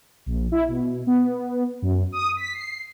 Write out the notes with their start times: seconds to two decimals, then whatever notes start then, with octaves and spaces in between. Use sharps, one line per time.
0.26 A#1
0.52 E4
0.68 B2
1.07 B3
1.82 F#2
2.12 D#6
2.37 B6
2.54 C7